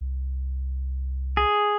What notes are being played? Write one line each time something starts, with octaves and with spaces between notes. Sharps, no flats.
C2
G#4